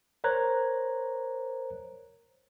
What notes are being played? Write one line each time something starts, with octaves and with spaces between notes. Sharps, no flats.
A#4 C5 C#5 A#5 F#6 G#6